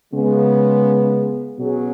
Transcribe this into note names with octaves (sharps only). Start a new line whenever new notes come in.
C#3 G#3 B3
B2 F#3 C#4 G#4